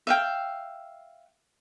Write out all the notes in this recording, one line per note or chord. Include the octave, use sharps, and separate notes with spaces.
E5 F5 G5